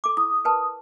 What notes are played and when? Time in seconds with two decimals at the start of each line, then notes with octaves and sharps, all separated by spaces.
0.04 A4 D6
0.17 E4 D#6
0.45 A#4 B4 A5